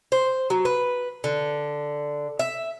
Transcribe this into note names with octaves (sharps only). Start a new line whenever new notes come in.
C5
F#3
B4
D3
E5